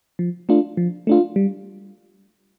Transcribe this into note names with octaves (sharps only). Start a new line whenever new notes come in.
F3
A3 D4 F4
F3
A3 D4 F4
G3